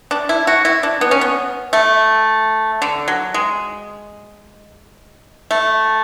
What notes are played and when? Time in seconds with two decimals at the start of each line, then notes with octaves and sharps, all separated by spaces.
0.11 D4
0.29 E4
0.47 F#4
0.65 E4
0.83 D4
1.01 B3
1.11 C#4
1.21 B3
1.73 A3
2.82 D3
3.08 F#3
3.34 G#3
5.51 A3